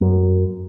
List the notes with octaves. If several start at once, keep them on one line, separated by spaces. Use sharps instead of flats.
F#2